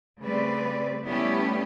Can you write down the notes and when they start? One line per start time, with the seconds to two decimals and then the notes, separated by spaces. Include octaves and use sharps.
0.19 C#3 G3 A3 C4 B4 D5
1.05 G3 A3 B3 C#4 E4 G4